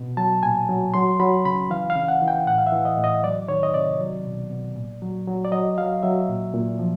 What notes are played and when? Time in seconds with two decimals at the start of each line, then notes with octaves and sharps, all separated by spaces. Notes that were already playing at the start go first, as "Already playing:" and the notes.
Already playing: B2
0.17 F#3 A5
0.43 A#2 G#5
0.69 F#3
0.94 F#3 C6
1.20 F#3 B5
1.45 C#3 B5
1.70 E3 F5
1.90 F5
1.96 C#3
2.08 F#5
2.22 E3
2.28 G5
2.47 A2 F#5
2.58 F5
2.67 E5
2.72 E3
2.85 D#5
2.97 A2
3.04 D#5
3.23 F#3 D5
3.49 D#3 C#5
3.63 D#5
3.74 C3 D5
4.00 F#3
4.25 B2
4.50 B2
4.76 A#2
5.02 F#3
5.27 F#3
5.45 D5
5.52 F#3 D#5
5.78 F#3 F5
6.03 F#3 E5
6.29 A#2
6.54 A#2
6.79 F3